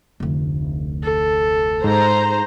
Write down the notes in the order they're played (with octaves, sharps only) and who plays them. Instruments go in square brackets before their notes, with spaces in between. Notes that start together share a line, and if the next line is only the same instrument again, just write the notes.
[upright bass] F1 D2
[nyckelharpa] A4
[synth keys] G#2 [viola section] C5 A#5